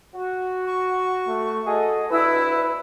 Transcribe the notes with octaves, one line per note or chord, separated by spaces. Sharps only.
F#4
C#6
A3
F#4 G#4 A4 D#5
D2 G2 E4 B4 E6